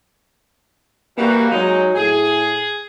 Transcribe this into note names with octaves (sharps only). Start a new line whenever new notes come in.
E3 G3 A#3 F#4
F#3 G#3 D#4
A2 G#4